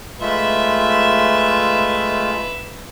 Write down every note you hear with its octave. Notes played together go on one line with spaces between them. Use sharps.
G#3 A3 F4 B4 E5